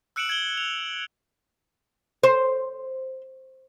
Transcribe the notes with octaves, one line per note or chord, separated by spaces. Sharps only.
E6 F#6 C#7 D7 E7 F#7
G#6 F#7 G7
F7
C5